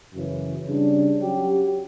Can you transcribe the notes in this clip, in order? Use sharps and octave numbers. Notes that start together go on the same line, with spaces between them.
F#2 C#3 E3
C#3 G3 D4
F#3 C#4 G4